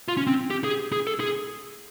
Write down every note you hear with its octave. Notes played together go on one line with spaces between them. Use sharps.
F4
C#4
C4
G4
G#4
G#4
A4
G#4